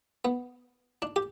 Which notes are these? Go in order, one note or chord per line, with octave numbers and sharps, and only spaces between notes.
B3
D4
G4